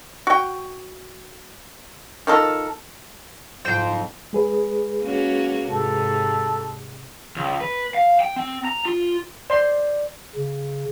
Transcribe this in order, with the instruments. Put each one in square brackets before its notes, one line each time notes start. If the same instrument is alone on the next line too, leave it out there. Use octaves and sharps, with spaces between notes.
[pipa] F#4 G5
D#3 F3 A4 A#4
[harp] F#1 G#2 F4 [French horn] F2 [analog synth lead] C5 [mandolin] G5
[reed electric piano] G#3 G#4 B4
[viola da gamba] A#3 C#4 F#4
[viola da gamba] G#2 C3 [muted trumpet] A4
[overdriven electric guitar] C#2
B4
F5
G5
C4
A#5
F4
[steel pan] C5 C6 [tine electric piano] D5
[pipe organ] C#3